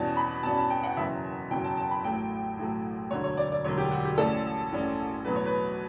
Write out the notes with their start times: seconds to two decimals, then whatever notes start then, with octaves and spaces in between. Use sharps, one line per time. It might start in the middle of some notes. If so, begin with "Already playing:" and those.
Already playing: E2 B2 G3 C#4 A5
0.17 B5
0.43 E2 B2 G3 C#4 A5
0.57 A5
0.70 G5
0.83 F#5
0.97 F#1 E2 B2 F#3 C#4 E5
1.50 F#1 E2 B2 F#3 C#4 G5
1.64 A5
1.77 A5
1.91 B5
2.04 A1 A2 F#3 A3 G5
2.57 A1 A2 F#3 A3
3.11 E1 D2 D3 F#3 C#5
3.24 C#5
3.37 D5
3.52 D5
3.64 E1 D2 D3 F#3 C#5
3.78 G4
3.91 F#4
4.05 G4
4.18 A1 A2 G3 C#4 A4
4.72 A1 A2 G3 C#4
5.25 E2 B2 F#3 A3 B4
5.36 C#5
5.46 B4